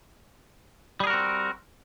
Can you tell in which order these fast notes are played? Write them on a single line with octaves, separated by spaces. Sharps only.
G3 G#4 A#4 F#4 C4